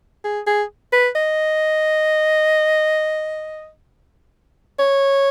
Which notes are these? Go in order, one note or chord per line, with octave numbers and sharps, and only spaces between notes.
G#4
G#4
B4
D#5
C#5